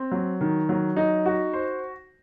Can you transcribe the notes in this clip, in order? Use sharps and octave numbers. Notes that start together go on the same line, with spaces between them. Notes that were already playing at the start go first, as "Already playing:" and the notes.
Already playing: C4
F#3
D#3
F#3
D#4
F#4
C5